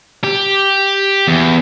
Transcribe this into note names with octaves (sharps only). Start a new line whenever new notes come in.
G4
E2